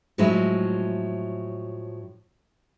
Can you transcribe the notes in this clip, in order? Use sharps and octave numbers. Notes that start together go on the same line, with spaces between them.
A2 F3 F#3 G#3 E4